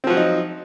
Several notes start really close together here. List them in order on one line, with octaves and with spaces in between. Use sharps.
C4 F3 F#4 F#3 D#4